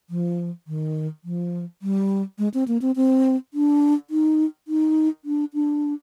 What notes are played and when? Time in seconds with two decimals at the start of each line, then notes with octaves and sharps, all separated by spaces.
0.10 F3
0.67 D#3
1.24 F3
1.82 G3
2.39 G#3
2.54 C4
2.68 A#3
2.82 C4
2.96 C4
3.54 D4
4.10 D#4
4.68 D#4
5.25 D4
5.54 D4